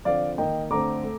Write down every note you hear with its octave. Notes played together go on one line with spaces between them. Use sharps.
D3 F3 C4 D5 F5
D#3 A#3 D#5 G5
D3 A3 C4 A#5 D6
A3